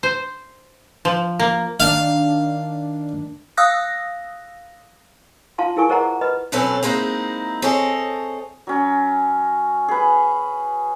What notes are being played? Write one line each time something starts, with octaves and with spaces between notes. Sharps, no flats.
C5
F3
A#3
D#3 D4 F5
F5 D#6 E6 F#6 A#6
F4 F5 A5 C6
E4 G#4 A#4 G#5 C#6
G#4 A#4 C5 D#5 F#5 A#5
B4 D#5 B5
B2 F#3 C4 C#4 A4 B4
G#3 A#3 C4 D#4 E4
C4 G#4 A4 C#5 D#5
F#3 C#4
G#4 B4